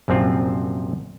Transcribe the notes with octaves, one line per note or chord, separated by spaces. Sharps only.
A#1 F#2 C3 C4 F4